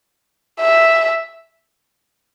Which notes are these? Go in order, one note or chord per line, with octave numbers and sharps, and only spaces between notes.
E5